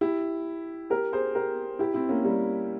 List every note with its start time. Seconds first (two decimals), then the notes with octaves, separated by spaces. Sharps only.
0.01 E4 G4
0.90 G4 A#4
1.13 G#4 C5
1.35 G4 A#4
1.79 E4 G4
1.94 C4 E4
2.09 A#3 C#4
2.24 G3 A#3